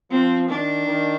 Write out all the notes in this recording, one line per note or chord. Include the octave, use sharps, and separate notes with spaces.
F3 C4
D#3 D4
D#3